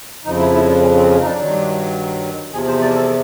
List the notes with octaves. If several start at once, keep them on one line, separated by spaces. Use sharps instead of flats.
F2 C#3 F3 D#4
E4
E4
D4
C#4
C4
C#4
D#4
D4
G2 D#3 F#3
E2 C3 F3 G#4
C5
D5
A4